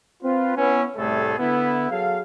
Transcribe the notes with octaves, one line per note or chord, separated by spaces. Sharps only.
C4 F4 B4
B3 C#4 E4
C2 A2 G3 A3 G#4 A4
D3 B3 E4
F#3 G#4 A4 F5